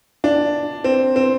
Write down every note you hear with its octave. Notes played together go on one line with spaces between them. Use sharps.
D4
C4
C4